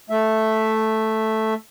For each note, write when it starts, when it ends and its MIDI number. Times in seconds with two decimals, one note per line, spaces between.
0.10 1.54 57
0.10 1.54 76